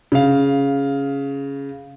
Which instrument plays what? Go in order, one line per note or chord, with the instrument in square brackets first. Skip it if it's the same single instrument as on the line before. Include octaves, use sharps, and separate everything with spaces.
[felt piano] C#3 F5